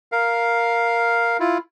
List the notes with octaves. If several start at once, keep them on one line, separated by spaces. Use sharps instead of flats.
A#4 F5
E4 F4